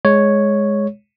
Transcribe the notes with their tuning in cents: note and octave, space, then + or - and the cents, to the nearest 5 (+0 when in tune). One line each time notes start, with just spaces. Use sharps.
G#3 +0 C#5 +0